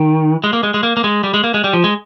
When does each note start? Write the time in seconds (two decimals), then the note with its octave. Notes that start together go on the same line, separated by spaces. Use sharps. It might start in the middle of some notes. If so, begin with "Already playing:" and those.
Already playing: D#3
0.44 G#3
0.53 A#3
0.63 G#3
0.74 G#3
0.83 A#3
0.97 A#3
1.04 G#3
1.24 G3
1.34 G#3
1.44 A#3
1.54 G#3
1.64 G3
1.73 F3
1.84 G#3